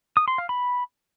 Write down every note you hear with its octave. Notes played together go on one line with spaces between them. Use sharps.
D#6
C6
F5
B5